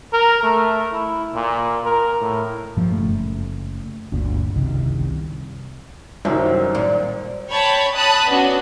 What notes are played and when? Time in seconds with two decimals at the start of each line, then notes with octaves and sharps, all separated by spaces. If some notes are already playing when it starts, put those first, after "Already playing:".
0.13 A#4
0.43 A3
0.92 E4
1.34 A#2
1.85 A#4
2.21 A2
2.77 G2 A#2 F3
2.92 F#1 A3
4.12 G1 D2 A#2
4.55 F#1 C2 D#3
6.25 C2 F#2 D#3 C4
6.75 A#2
7.49 C#5 G5 A5 B5
7.95 A5 B5 D#6 F#6
8.29 B3 C#4 D4 F#4